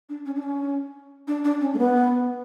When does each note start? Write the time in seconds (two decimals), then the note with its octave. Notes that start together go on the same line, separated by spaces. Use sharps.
0.09 D4
0.26 C#4
0.36 D4
0.43 C#4
1.28 D4
1.44 D4
1.61 C#4
1.74 A3
1.79 B3